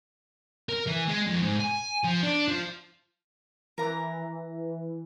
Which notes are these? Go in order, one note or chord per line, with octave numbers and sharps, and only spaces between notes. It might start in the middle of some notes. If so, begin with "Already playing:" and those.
A#4
E3
G#3
F2
G#2
G#5
F3
D4
F3
E3 A#4 A#5